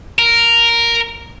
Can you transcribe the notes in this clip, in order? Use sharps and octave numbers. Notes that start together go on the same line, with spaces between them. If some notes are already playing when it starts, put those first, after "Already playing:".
A#4